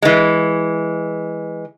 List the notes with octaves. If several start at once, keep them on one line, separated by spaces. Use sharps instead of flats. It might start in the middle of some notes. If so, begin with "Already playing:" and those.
E3 G#3